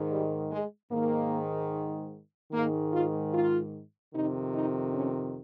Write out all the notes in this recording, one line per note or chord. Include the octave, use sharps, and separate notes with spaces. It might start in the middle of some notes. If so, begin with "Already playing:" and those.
Already playing: G#2 D#3
G3
G#3
G#2 D#3 A#3
G#2 D#3 A#3
F4
F4
F2 C3 D#3 D#4
D#4
C#4